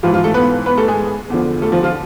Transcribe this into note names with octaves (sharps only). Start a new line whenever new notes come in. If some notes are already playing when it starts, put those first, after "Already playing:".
G#2 E3 F3 F4
F3 F4
A3 A4
B3 B4
B3 B4
A3 A4
G#3 G#4
E2 D3 F3
A3 A4
F3 F4
F3 F4